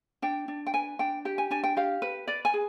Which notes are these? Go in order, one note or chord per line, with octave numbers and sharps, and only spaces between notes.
D4 G5
D4
G5
B4 G#5
D4 G5
G4 G5
G#5
D4 G#5
G5
G4 F5
B4
B4 D5
G#5
G#4